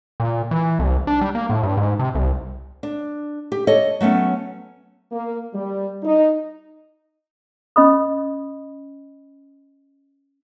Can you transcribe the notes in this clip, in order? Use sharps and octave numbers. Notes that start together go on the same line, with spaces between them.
A#2
E3
C2
D4
G3
A#3
A2
G2
G#2
C3
C2
D4
G4
A4 C#5 D#5
F#3 A3 B3 C#4
A#3
G3
D#4
C#4 D#5 B5 D#6